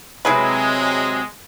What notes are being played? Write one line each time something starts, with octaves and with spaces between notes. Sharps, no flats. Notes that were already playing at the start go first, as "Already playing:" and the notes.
C3 F#3 G#3 C4 E4 G#4 B4